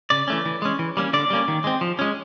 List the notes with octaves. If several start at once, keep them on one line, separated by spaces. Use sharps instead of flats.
C#3 D5
E3 A3 C#4
E3
G#3 C#4
E3
G3 A#3 C#4
D3 D5
G3 A#3 C#4
D#3
G#3 C4
F3
G#3 C#4